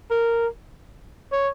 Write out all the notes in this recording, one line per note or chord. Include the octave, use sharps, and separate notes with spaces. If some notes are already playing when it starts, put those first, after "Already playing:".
A#4
C#5